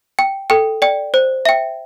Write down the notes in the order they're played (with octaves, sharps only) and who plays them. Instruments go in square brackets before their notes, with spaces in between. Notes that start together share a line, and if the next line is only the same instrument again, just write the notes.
[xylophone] G5
A4 G5
D5 G5
C5
E5 G5